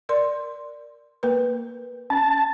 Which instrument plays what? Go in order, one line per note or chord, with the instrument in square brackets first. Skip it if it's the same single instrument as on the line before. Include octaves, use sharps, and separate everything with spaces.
[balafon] A#4 D5 C6
A#3 A#4 B4
[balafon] C#4 [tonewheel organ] A5